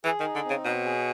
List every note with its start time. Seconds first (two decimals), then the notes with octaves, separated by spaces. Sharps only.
0.05 E3 G#4
0.20 D#3
0.25 D#4
0.35 D3
0.45 C#3 C4
0.65 B2 C#5
0.85 G#4